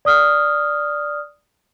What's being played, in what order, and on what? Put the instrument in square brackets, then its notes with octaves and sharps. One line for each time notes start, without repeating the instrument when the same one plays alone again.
[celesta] D5 D#6 F6